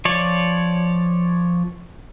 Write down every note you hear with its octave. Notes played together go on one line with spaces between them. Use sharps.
F3 C#5 D5